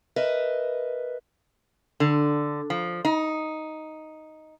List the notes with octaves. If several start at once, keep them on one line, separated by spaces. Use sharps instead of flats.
A#4 B4 D#5 E5
D3
F3
D#4